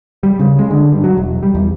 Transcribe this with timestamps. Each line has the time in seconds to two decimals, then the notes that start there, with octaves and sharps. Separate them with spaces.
0.23 G3
0.39 C#3
0.59 G#3
0.71 D3
0.92 G2
1.04 F#3
1.17 E1
1.43 G3
1.55 E2